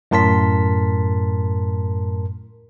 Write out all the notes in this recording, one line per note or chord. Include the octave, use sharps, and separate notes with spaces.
F#2 A2 A#4 A5 C6 B6